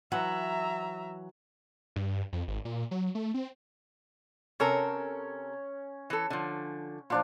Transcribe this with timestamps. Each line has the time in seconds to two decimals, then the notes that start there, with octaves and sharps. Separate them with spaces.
0.12 E3 F#3 E5 F#5 A#5
1.96 G2
2.33 F2
2.48 G#1
2.65 A#2
2.91 F#3
3.15 A3
3.34 C4
4.60 C3 C#4 A4 A#4
6.10 E3 A4
6.30 D3 F3
7.10 A#2 F3 D4 F4